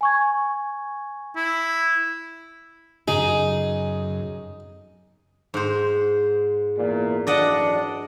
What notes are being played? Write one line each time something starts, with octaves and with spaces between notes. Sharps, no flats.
G#5 C#6 G#6
E4
F#2 C#3 D#4 G#4
G#2 C5
E2 A#2
F#2 E3 D4 D5 D#5 F#5